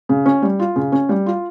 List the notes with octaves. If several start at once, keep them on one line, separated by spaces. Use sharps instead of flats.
C#3
C#4
G3
F4
C#3
C#4
G3
F4